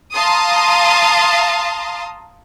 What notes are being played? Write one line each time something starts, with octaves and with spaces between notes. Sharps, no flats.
F5 A5 A#5 C6 D#6